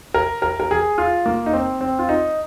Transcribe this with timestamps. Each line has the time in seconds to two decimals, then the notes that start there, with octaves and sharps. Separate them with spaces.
0.14 A#4
0.42 A#4
0.60 A#4
0.71 G#4
0.98 F4
1.26 A#3
1.46 D#4
1.53 C4
1.81 C4
1.99 F4
2.09 D#4